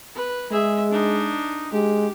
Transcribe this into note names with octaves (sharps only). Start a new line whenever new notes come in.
B4
G#3 G#4 E5
D4 D#4
G#3 G4